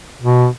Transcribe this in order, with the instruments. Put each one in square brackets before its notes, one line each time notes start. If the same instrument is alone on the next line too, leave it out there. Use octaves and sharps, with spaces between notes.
[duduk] B2